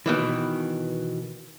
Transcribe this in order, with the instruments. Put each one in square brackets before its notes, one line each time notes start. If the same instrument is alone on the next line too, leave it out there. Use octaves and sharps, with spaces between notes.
[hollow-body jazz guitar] B2 D#3 E3